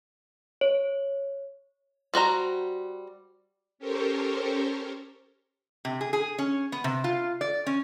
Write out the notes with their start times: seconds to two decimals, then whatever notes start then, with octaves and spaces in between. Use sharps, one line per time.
0.61 C#5
2.14 G3 F#4 C5 A#5
3.79 C#4 G4 A4 A#4 C5 C#5
5.85 C3
6.01 G#4
6.13 G#4
6.38 C#4
6.72 B3
6.84 C3
7.04 F4
7.41 D5
7.66 C#4